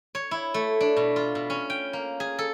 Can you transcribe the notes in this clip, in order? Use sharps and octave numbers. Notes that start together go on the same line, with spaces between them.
C#5
E4
A3
D4
B2
F4
B2
C#4
G5
A#3
G#4
A4